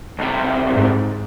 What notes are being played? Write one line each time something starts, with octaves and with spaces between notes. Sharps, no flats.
B1 C3
G#2